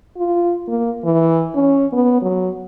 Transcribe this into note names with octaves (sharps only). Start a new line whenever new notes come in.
F4
A#3
E3
C#4
B3
F#3